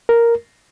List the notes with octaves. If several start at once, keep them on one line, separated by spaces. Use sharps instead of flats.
A#4